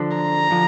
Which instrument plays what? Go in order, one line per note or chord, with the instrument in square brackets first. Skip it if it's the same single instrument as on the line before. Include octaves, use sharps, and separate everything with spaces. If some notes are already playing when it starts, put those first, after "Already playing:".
Already playing: [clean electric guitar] D3 F3 D4
[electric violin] A#5
[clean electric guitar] D3 F3